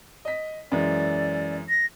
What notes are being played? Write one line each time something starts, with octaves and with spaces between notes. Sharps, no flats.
D#5 B6
F#2 E3 G#3 D5
A#6